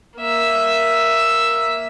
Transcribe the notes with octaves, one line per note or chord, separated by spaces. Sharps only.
A#3 E5